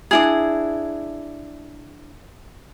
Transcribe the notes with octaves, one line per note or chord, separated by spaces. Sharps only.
D4 E4 G#4